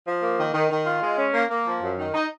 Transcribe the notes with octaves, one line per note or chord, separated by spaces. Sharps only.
F3
A#3
D#3
D#3
D#3
F4
G#3
C#4
A#3
A#3
F3
F#2
D#3
D#4